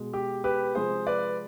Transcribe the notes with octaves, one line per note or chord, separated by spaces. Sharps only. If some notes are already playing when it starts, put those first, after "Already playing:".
Already playing: B2 G#3
G4
G4 B4
C3 F3 G#3 G#4 C5
B4 D5